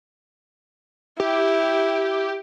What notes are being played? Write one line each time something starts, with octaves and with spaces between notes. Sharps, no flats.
E4 G4